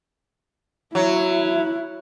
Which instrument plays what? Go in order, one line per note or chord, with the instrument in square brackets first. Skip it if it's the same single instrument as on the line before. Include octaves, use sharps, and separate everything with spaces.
[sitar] F#3 [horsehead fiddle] E4